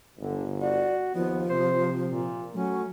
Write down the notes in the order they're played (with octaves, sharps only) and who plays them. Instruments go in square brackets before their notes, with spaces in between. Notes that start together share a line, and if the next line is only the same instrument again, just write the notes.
[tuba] G1 [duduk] D3
[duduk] F#4 [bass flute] D5
[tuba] D#2 [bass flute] F3 [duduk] B3
[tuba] C3 [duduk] C5
[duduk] A#2
[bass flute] F#3 [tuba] A3 [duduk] C#4